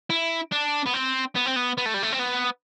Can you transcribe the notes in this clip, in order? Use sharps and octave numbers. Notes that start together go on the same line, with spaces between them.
E4
D4
B3
C4
B3
C4
B3
B3
A3
G3
A3
C4
B3